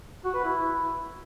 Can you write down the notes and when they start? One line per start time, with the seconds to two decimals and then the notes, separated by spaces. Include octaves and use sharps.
0.25 F#4
0.34 B4
0.44 E4